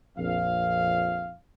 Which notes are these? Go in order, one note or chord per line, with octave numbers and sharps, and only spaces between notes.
A#1 F2 F5